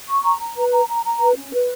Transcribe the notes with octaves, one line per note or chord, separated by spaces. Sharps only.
C#6
A#5
A#5
B4
A#5
A#5
A#5
B4
C#4
B4